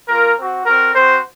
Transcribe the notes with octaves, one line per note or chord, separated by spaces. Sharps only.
A#3 F4 A#4
C4 F#4
C4 F#4 A#4
C4 F#4 C5